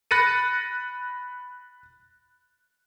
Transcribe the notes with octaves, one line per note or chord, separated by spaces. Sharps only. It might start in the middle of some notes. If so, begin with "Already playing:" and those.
B5 F#6 A6 A#6 C#7 D#7